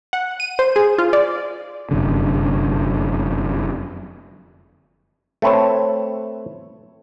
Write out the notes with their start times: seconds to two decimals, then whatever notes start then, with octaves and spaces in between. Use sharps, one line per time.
0.13 F#5
0.40 D#7
0.59 C5
0.76 G#4
0.98 F4
1.13 D5
1.91 F1 F#2 D3
5.42 A3 C4 B4 C#5 A5